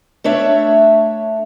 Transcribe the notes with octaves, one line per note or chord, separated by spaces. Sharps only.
A3 D4 C#5 E5